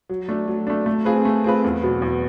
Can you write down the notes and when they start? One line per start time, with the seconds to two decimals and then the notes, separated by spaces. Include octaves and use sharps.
0.09 F#3
0.29 A3 D4
0.48 F#3
0.67 A3 D4
0.86 A3
1.05 C4 F4 G#4 B4
1.25 A3
1.44 C4 F4 G#4 B4
1.64 E2
1.83 B2 F#3 B3
2.02 E2